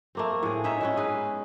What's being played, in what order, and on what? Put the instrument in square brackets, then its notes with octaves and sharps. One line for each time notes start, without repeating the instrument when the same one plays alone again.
[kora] A3 A#3 C4
A2 G#4
C#4 D#4 C#5 E5
G#3 B3 C#4
D#4 G#4 B4